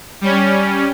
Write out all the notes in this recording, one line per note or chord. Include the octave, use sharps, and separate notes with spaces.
G3 C#4